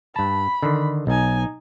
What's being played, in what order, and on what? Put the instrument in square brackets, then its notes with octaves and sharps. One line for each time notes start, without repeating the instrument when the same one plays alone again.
[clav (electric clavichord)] G2 A5 [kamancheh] B5
[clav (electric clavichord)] D3 D#3
[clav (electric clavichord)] B1 [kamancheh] D#4 G#5